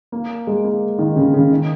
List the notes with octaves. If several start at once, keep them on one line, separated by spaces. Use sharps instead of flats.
A#3
G#3
A#3
D#3
C#3
C#3
D#3